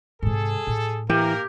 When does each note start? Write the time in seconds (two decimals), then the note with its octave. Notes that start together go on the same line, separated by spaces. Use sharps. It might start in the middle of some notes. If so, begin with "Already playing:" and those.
0.23 G#2 C3 G#4 A4
0.67 A2
1.10 E3 A#3 G4 A#4